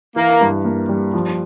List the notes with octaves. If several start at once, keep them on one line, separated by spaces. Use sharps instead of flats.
E3 A#3
G2
A#3
G3
F3